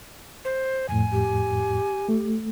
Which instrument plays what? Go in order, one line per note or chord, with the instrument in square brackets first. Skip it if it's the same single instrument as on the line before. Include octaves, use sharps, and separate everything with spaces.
[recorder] C5
[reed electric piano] F2 A2 [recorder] G#5
[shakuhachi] G4
[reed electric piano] A3